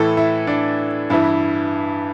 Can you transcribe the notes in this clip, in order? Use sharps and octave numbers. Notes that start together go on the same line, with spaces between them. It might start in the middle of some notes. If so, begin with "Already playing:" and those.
Already playing: A2 E3 A4
E4
D4
G2 E3 E4